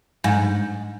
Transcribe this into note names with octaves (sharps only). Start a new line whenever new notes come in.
G#2